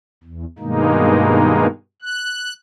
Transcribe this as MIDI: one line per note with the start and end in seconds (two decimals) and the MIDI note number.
0.24 0.45 40
0.59 1.67 43
0.59 1.67 47
0.59 1.67 51
0.59 1.67 56
0.59 1.67 58
0.59 1.67 63
2.02 2.53 90